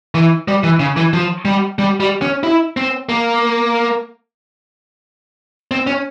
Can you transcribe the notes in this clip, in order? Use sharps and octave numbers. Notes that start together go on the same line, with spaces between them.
E3
G3
E3
C#3
E3
F3
G3
G3
G3
C#4
E4
C4
A#3
C4
C#4